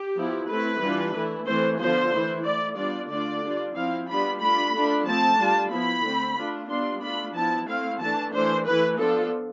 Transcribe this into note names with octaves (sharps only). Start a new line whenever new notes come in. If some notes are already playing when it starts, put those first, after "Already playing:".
Already playing: G4
F3 B3 E4
A3 C4 E4 B4
E3 G3 D4 F4
E3 A3 E4
E3 A3 C4 E4 C5
D3 F3 B3 F4 C5
E3 A3 E4
A3 E4 D5
G3 B3 D4 F4 D5
D3 A3 D4 F4 D5
G3 D4 F4
F3 C4 E4 F5
G3 B3 D4 F4 B5
A3 D4 F4 B5
A3 D4 F4
F3 A3 C4 A5
G3 D4 F4
F3 B3 E4 B5
D3 A3 C4
A3 D4 F4
G3 B3 D4 F4 C6
A3 D4 F4 B5
F3 B3 E4 A5
A3 C4 E4 F5
E3 A3 D4 A5
E3 A3 D4 C5
E3 A3 E4 B4
F3 B3 D4 F4 A4